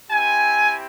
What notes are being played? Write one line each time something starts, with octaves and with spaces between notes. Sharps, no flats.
C4 E4 G4 G#5